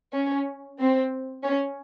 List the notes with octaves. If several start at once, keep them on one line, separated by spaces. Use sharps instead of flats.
C#4
C4
C#4